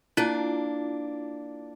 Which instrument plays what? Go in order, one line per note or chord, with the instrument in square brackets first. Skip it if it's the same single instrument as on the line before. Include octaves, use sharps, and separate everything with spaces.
[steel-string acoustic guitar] A#3 D4 [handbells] E4 F4